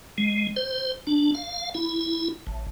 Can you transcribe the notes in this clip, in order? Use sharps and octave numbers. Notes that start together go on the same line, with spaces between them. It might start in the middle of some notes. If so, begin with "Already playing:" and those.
G#3
C5
D4
F5
E4
A1